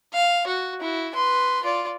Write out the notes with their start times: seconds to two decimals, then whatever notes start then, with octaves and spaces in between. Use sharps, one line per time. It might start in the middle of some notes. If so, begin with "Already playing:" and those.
0.13 F5
0.47 F#4
0.80 E4 F#4
1.15 B4 C6
1.64 F4 D5